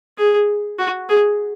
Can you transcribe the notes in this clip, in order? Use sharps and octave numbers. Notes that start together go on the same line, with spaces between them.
G#4
F#4
G#4